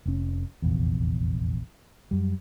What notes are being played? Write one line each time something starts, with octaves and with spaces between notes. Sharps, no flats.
F1 C#4
F1 A#1 E2
F#2 G3